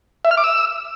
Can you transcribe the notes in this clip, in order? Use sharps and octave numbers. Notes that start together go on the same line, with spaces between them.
E5
F6
D6
E6